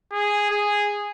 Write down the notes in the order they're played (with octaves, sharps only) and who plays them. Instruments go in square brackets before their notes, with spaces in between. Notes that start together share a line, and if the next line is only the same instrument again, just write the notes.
[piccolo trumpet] G#4
G#4